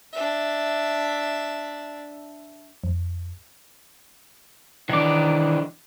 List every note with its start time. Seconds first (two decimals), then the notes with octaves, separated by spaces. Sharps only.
0.13 D4 E5
2.84 F2
4.89 D#3 E3 D4 D6